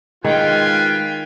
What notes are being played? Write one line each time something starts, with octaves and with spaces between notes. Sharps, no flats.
D#3 G#3 F4 B4 F5 G5 G#5